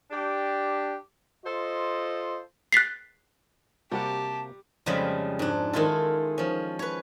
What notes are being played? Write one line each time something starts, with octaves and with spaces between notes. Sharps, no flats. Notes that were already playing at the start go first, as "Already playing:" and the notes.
D4 G4
F4 A4 C5 D#5
F#6 A6 B6 C7
C3 G3 A#3 F#4 G4 F#5 A5
F2 C#3 F3 G3 G#3 B5
G#2 D4
D#3 G#3 E4 F4 A4
F3 C#4
B4 C#5